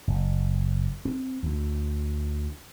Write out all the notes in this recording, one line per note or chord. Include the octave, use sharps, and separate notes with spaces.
F#1
C4
D2